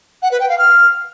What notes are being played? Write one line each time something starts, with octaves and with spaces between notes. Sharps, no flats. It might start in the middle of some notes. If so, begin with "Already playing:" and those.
F#5
B4
G5
F5
F6